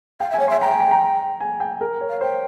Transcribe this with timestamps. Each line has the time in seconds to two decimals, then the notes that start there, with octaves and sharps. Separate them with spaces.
0.20 F5 G5
0.30 E5 G#5
0.39 C#5
0.48 E5 C6
0.61 G5 A#5
0.71 G#5
0.80 A#5
0.91 A#5
1.40 G#5
1.60 G5
1.81 A#4
2.01 C#5
2.09 F5
2.21 C5 G5